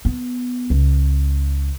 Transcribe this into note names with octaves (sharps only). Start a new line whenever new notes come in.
B3
C#2